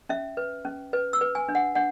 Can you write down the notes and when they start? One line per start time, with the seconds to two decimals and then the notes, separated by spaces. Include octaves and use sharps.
0.09 C#4 E5
0.37 B4
0.65 C#4
0.93 B4
1.13 E6
1.21 B4
1.35 G#5
1.48 D4
1.55 F#5
1.75 D4 F#5